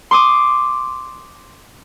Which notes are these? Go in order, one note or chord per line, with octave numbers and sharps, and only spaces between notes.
C6 D6 D#6